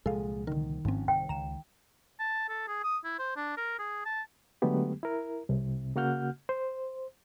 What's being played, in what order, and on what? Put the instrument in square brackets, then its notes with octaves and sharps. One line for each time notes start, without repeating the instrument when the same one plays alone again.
[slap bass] C2 A#2 F3 [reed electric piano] G#3 G#4 [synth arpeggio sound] A4 F5
[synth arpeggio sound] D3 A#4 [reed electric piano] D#3
[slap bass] G#1 F3 C#4 [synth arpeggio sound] G#2 C4
[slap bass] C2 [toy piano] G5
[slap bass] C#2 [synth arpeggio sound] A#5 E7
[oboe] A5
A4
G#4
D#6
E4
C5
D4
A#4
G#4
A5
[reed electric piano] D3 F#3 G#3 A3 B3 G4
E4 A#4
C2 C3
C#3 A#3 F#4 F#5 F6 G6
C5